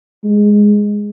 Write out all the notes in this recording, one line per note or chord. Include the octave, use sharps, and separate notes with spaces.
G#3